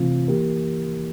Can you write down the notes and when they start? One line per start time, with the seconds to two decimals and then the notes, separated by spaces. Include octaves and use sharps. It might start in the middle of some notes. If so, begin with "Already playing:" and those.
Already playing: C3 E3 A3 C4 F4
0.28 E3 A#3 E4 G4 A#4